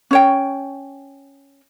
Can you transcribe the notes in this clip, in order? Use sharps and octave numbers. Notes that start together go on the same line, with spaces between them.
C#4 C#5 G5